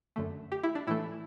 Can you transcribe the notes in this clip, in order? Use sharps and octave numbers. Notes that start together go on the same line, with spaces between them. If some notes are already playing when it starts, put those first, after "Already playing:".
F#2 D3 A3
G4
E4
D4
A2 E3 A3 E4